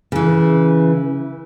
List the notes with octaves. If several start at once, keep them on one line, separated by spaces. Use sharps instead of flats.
C#3 E3